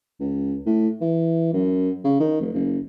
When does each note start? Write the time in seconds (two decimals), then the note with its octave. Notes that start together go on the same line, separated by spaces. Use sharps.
0.20 C#2
0.66 A2
1.01 E3
1.53 F#2
2.04 C#3
2.20 D#3
2.41 F1
2.54 F#1